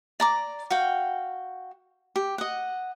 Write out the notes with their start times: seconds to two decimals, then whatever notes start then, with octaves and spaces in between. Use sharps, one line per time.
0.20 D5 A#5 D6
0.70 F#4 F5 G5
2.16 G4
2.38 D#5 F#5